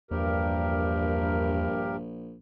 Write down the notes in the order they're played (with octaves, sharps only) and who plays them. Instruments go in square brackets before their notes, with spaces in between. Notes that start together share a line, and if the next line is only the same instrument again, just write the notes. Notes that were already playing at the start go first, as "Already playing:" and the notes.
[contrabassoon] A#1 [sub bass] E2 [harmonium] G2 G4 A#4